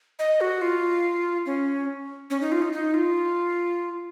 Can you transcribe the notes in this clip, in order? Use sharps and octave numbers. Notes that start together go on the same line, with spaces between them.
D#5
F#4
F4
C#4
C#4
D#4
F4
D#4
D#4
F4